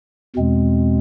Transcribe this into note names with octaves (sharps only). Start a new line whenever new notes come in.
E2 B2 G#3 C4